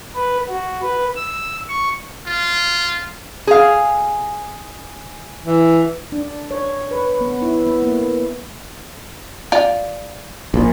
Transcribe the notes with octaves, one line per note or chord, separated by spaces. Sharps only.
B4
F#4
B4
E6
C#6
F4
G#4 F5
E3
D4
C#5
B4
B3
E4
B3
A#3
F4 D5
A#1 A#2